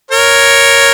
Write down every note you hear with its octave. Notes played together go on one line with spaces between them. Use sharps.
A#4 C#5